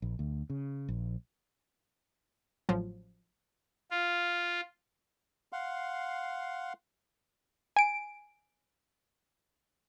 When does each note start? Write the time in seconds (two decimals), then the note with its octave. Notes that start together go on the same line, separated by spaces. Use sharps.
0.02 A#1
0.19 D2
0.50 C#3
0.89 A#1
2.69 A1 F3 F#3
3.91 F4
5.53 F5 F#5 C6
7.76 G#5 D7